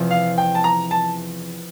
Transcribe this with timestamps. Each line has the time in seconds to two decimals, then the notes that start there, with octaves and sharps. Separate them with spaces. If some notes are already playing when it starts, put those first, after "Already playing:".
Already playing: E2 C3 F3 C4
0.11 F5
0.38 G5
0.55 A5
0.64 A#5
0.91 A5